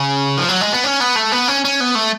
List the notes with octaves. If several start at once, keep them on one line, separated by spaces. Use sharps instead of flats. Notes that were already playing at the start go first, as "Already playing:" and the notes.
Already playing: C#3
F3
F#3
G#3
B3
C#4
B3
A3
B3
C#4
C#4
B3
A3